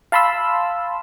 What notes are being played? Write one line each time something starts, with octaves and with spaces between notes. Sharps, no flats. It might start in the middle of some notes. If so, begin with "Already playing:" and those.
F5 A5 B5 C6 E6